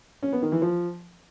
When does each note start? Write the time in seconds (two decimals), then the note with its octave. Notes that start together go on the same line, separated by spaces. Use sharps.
0.23 C#4
0.32 B3
0.42 D#3
0.52 E3
0.62 F3